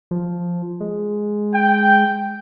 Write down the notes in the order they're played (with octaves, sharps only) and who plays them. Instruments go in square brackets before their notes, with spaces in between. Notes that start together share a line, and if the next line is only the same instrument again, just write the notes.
[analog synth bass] F3
G#3
[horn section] G5